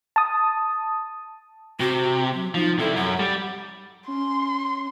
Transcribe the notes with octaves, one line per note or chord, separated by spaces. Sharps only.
A5 D#6
C3 F#4
F#3
F3 D#4
C3 E4 A4
F#2 F#5
G3
C#4 C6